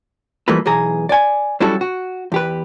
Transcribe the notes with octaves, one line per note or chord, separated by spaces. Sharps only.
E3 F3 G3 A3 A#3 B4
B1 E3 G#4 A#5
D5 G#5
F#3 G3 C#4 E4 F#4 A4
F#4
E2 G4 B4